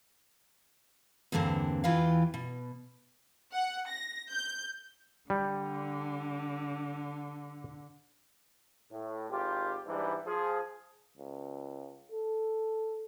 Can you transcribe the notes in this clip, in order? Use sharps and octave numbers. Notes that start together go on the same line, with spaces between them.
E2 G2 D3 A#3 C4
E2 E3 F4 G4 F5
B2
F#5
A#6
G6
D3 G3
A2
G#1 F4 G4
G#2 E3 G3 D4
F3 G#4
C#2
A4